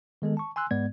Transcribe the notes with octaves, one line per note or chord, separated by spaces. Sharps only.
D#3 G#3 B3 A4
A5 C#6
G#5 C6 E6 F#6
G#2 G#3 B3 D5 G#6